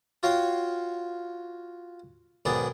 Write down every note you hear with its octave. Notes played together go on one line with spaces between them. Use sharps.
F4 F#4 C#5 F5 G5
B1 G#2 D#3 B3 G#4 D5